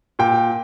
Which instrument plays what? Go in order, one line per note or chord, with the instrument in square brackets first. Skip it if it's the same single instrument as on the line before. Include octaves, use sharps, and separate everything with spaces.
[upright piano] A#2 G5